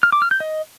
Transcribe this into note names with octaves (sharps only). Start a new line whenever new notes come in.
F6
D6
F6
G6
D#5